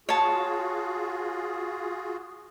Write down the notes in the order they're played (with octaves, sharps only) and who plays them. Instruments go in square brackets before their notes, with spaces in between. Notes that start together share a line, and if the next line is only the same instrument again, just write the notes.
[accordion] F4 F#4 G#4 [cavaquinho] C#5 A5